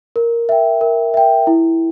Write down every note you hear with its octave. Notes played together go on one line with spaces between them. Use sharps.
A#4
E5 G5
A#4
E5 G5
E4